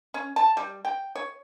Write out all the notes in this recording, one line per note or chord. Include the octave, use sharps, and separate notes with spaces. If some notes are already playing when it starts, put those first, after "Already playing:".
C#4
A5
G3
G5
C#5